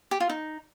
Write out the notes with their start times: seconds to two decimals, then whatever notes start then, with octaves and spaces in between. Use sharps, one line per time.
0.11 G4
0.20 F4
0.29 D#4